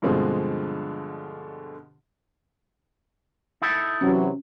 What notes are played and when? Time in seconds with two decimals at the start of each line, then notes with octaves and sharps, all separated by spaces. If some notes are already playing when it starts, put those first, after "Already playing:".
0.02 G2 B2 D3 F3 G#3 C4
3.62 D#4 E4 A4
4.01 C3 E3 F#3 C#4